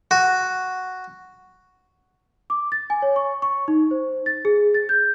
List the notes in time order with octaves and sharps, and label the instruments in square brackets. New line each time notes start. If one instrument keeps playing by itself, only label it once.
[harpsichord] F#4
[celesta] D6
A6
G#5
C#5
C#6
C#6
D#4
C5
A6
G#4
A6
G6